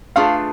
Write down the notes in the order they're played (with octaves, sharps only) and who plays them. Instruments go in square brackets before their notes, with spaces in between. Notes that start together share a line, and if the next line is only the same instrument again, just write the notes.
[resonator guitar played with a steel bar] A3 D4 F4 G#4 B4 [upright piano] F5